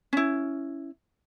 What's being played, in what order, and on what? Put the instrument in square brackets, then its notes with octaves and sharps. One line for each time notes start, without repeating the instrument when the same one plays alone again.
[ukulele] C#4 E4